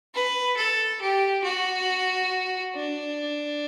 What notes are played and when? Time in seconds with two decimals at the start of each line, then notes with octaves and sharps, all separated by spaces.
0.14 B4
0.57 A4
1.01 G4
1.44 F#4
2.76 D4